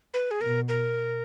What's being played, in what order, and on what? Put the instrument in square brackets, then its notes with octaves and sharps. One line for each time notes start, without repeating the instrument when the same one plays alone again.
[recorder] B4
G#4
[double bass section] B2 [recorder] A#4
[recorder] A#4